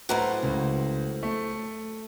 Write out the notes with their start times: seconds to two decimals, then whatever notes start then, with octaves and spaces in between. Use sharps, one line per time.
0.09 F#2 A2 F#4 B4 C5 A#5
0.43 C#2
1.23 A3